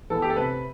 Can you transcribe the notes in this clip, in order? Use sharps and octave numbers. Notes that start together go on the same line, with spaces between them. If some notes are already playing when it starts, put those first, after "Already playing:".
E3 B3 A4
G4
A4
C3 B4